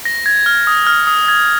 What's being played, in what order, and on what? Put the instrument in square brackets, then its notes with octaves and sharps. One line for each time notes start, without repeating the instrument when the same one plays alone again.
[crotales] A#6
G#6
F6
D#6
F6
D#6
G#6